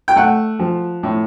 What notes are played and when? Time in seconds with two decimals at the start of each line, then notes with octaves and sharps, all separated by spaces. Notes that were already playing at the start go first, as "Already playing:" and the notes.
0.08 G5
0.16 A3 F#5
0.59 F3
1.03 A2